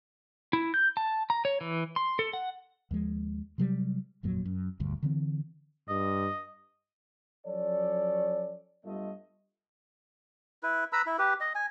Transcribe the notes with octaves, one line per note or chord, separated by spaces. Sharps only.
E4
G6
A5
A#5
C#5
E3
C6
A4
F#5
D#2 F3 G#3
C3 F#3 G3
G1 F2 A#2 F#3
F#2
D#1 D2 G2
D3 E3 C4
G2 D#5
F3 F#3 C#4 A4 C#5 D5
G2 G3 A3 B3 F4 D#5
E4 B4
B4 A#5 B5 E6
E4
G4 B4
D#5
G#5